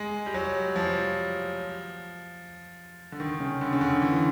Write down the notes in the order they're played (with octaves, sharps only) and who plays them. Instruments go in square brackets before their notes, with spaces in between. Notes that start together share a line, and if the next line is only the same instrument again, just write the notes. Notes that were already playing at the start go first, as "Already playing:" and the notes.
Already playing: [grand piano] G#3
G3
F#3
F3
D3
D#3
C#3
D3
C#3
D3
E3